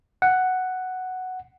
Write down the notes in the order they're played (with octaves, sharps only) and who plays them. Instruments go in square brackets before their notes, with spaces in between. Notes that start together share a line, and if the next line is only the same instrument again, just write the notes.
[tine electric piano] F#5